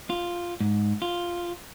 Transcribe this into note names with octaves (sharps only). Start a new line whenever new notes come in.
F4
G#2
F4